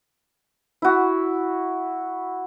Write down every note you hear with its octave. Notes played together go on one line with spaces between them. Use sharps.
E4 F#4